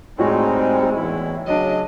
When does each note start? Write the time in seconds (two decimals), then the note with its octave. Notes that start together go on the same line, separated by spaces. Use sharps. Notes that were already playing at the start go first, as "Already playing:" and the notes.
0.19 A2 G3 G#3 C4 D#4 F#4 G#4
0.94 E2 E4
1.47 C#3 F#3 D4 D#5